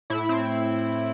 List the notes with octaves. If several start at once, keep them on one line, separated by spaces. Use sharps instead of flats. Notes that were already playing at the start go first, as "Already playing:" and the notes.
A2 E4
C4